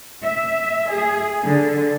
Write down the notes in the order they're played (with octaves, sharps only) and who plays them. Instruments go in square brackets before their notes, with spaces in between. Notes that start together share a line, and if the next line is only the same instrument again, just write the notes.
[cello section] E5
G#4
D3